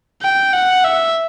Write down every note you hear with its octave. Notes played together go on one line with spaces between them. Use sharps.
G5
F#5
E5